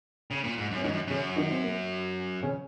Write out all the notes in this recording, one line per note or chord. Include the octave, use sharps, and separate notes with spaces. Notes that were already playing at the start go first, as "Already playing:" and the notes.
C#3
A#2
G#2
F#2
C#4
G#2 D#3 D#4
F#2
F#2 C#3 C#4
D#3 D#4
C4
A#3
C#3 C#4